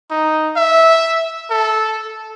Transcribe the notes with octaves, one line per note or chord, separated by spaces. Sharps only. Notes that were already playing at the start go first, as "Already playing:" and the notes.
D#4
E5
A4